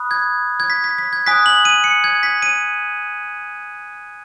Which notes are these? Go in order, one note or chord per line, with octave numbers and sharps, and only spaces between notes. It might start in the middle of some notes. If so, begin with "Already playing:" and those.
Already playing: B5 D#6 F#6
G#6
G#6
B6
B6
B6
G#6
G#5 D#6 F#6 B6
F#7
D#7
C#7
G#6
B6
D#7